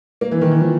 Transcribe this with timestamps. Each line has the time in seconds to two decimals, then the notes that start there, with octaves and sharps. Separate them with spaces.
0.21 A#3
0.31 E3
0.41 D#3
0.51 E3
0.61 F3